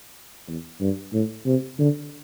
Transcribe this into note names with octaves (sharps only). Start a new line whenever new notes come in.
E2
G2
A2
C3
D3